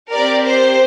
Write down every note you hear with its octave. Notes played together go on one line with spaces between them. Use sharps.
C4 G4 A#4 D5
C5